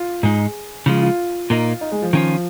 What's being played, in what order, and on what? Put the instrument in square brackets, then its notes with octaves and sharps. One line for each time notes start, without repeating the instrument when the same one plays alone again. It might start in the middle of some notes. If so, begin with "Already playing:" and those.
Already playing: [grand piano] F4
[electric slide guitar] G#2 G#3 D#4 [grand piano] G#4
[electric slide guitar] C#3 F3 G#3 [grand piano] F4
[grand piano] F4
[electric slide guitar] A#2 A#3 D#4
[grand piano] D#4
G#3
F3
[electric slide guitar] D#3 C#4 F4 [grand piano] F3